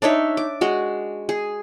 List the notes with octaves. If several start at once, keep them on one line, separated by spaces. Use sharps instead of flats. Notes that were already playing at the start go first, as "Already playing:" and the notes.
D4 D#4 C#5 E5
D6
G#3 F#4
G#4